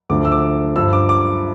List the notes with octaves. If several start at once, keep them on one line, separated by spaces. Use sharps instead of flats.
D2 D3 F3 D6
E6
D6
G2 F3 E6
D6
D6